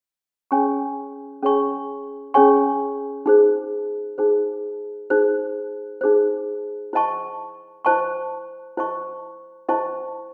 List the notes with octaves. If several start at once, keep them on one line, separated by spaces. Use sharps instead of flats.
C#4 G#4 C#5 G#5 C#6
C#4 G#4 C#5 G#5 C#6
C#4 G#4 C#5 G#5 C#6
D#4 G#4 C5
D#4 G#4 C5
D#4 G#4 C5
D#4 G#4 C5
E4 C5 D#5 A5 C#6
E4 C5 D#5 A5 C#6
E4 C5 D#5 A5 C#6
E4 C5 D#5 A5 C#6